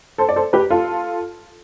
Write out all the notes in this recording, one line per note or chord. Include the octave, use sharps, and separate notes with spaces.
A4 C5
D5
A4 C5
G4 B4
F4 A4